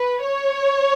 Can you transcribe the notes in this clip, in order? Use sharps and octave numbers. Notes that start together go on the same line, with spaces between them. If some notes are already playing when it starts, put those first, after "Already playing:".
Already playing: B4
C#5